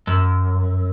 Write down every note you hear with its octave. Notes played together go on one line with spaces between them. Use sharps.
F#2